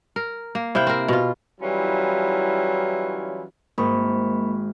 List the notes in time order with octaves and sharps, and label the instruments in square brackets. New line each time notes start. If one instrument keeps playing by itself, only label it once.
[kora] A#4
A#3
C3 E4 F5 G5
C4 A#4
B2 F4
[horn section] E3 F#3 G3 C#4 E4 F4
[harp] G#1 [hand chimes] A#3 B5 C#6